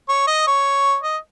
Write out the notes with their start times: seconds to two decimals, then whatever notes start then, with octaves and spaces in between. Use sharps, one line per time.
0.09 C#5
0.27 D#5
0.47 C#5
1.03 D#5